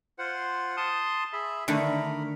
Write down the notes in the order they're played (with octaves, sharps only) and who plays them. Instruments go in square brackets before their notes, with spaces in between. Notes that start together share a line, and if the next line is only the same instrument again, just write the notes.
[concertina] F4 C5 F#5
A5 C6 D#6
G#4 E5 B5
[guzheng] D3 D#3 A3 [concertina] A#4 B5